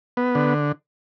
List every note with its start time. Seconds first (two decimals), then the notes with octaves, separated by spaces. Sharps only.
0.17 B3
0.35 D3